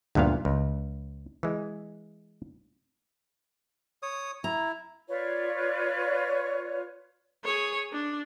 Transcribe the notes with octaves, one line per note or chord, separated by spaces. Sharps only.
D2 G2 A#2 B3 F5
C#2
E3 G#3
C#5 D#6
E4 A#5
F4 B4 C#5 D5
G#4 C#5
D4